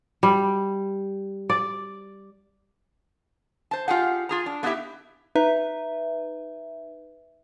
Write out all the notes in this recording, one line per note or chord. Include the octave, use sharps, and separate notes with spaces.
G3
D5
C5 A5
F4 G4 G#4 F#5
F4 G#4 A#5
D4
A3 B3 D#4 E4 G4 E5
D#4 B4 E5